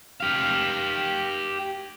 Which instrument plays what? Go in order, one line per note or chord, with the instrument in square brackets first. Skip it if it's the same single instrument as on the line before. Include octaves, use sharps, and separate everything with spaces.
[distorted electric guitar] G4 F5